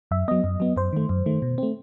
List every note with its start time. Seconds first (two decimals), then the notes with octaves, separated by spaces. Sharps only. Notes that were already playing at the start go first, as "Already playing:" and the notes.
0.11 F#2 E5
0.28 F#3 B3 D#5
0.44 F#2
0.60 F#3 B3
0.76 F#2 C5
0.93 D#3 A3
1.09 F#2
1.26 D#3 A3
1.42 B2
1.58 A3 C4